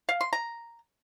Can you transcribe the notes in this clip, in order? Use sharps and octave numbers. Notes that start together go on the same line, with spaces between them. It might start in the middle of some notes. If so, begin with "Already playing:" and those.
F5
C6
A#5